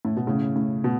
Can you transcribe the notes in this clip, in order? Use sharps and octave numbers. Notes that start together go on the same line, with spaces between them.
A2
B2
A2 C#3
A2
B2